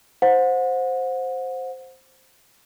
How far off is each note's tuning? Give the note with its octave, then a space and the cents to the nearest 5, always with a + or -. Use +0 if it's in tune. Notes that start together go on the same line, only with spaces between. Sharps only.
C5 +0 F#5 -30